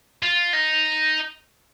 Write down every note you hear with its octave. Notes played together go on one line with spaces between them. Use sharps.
F4
D#4